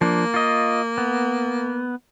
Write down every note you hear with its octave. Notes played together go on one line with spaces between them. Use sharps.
F3 A#3 D4
F4 D#5
B3